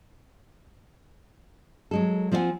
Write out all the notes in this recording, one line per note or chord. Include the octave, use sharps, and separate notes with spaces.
F#3 G#3 A4
F3 C4 F4 E5 F#5 G#5